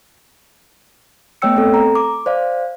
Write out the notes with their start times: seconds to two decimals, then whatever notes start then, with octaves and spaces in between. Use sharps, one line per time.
1.42 A3 B3 C#5 G5 E6 C#7
1.57 C4 A4
1.74 A#5
1.95 D6
2.26 C5 D5 F5